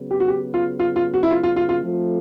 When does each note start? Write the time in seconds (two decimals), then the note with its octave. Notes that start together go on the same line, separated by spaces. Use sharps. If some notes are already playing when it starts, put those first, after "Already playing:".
Already playing: C#3 F#3 B3
0.11 G4
0.20 F#4
0.28 G4
0.54 F4
0.79 F4
0.96 F4
1.14 F#4
1.23 E4
1.31 F4
1.43 F4
1.56 F4
1.69 F4
1.82 F3 A3 C4 F4 A4